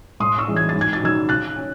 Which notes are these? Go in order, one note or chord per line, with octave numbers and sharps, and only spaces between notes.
A2 C6 D#6
C#6 E6
E3 G#3 C#4
G#6
A6
G#2
G#6
A6
D#3 F#3 C#4 E6 G#6
C#3 F#6 A6
C#4